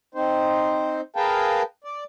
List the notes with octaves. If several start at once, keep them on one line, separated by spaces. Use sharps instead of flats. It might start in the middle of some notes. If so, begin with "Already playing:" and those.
C4 D#4 C5
G#4 A#4 B4 F5 G5 A5
D5